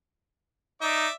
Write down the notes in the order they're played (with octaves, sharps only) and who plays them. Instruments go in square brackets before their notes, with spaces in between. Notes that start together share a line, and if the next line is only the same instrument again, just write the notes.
[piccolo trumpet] D#4 [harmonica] D5 E5 D6